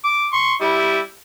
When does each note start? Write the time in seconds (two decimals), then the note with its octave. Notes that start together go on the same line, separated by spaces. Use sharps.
0.04 D6
0.33 C6 C#6
0.61 G3 E4